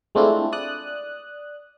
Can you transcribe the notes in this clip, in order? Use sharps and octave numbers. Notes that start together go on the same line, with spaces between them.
G#3 A3 C4 D4 E4 F4
D5 D#6 F#6